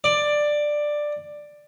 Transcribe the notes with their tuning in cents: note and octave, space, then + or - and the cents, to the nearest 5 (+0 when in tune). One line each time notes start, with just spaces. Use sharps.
D5 +10